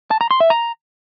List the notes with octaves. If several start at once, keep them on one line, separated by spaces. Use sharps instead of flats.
A5
A#5
C6
E5
A#5